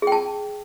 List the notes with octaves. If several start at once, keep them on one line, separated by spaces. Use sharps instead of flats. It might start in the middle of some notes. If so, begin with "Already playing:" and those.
G#4 G5 A5